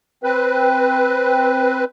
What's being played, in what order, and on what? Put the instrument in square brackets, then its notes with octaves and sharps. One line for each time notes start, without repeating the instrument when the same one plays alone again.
[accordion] C4 B4